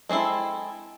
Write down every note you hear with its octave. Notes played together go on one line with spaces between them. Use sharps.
G#3 C4 C#4 E4 A4